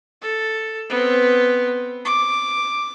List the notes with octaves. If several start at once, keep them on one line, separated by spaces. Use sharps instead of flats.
A4
B3 C4
D6